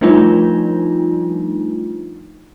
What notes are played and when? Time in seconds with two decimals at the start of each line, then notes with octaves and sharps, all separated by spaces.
0.01 F3 G3 A3 D4 D#4 F4